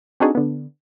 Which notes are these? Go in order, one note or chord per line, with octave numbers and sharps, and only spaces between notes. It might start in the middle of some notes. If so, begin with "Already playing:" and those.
C4 D4 D#4 F#4 G#4 A4
D3 B3